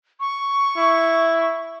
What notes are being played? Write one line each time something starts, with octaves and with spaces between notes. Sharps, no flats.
C#6
E4